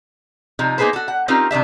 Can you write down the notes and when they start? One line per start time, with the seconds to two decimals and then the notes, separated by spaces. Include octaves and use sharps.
0.59 C3 F3 D#4
0.78 A#3 B3 D#4 G#4 B4 C5
0.93 F#4 A4
1.08 F#5
1.28 C4 C#4 D#4 F4 G4 A#4
1.51 C3 D#3 D4 E5